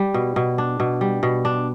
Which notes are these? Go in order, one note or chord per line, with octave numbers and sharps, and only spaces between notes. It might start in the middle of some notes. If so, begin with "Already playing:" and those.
Already playing: G3
B2
B2
D4
B2
G3
B2
D4